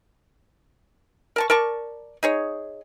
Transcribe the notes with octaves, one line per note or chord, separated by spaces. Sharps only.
A#4 A5 C#6
A#4 D5 A5 C#6
D#4 G#4 C#5